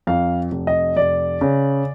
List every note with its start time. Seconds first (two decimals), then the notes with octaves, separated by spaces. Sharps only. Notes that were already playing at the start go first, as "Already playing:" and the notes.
0.07 F2 F5
0.51 F1
0.67 D#5
0.97 F1 D5
1.41 C#3